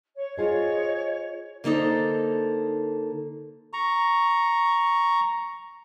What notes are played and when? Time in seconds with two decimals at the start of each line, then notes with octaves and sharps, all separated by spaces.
0.16 C#5
0.38 F4 G#4 C5 C#5 D#5
1.64 D3 A#3 D#4 A4 C5
3.73 A#5 C#6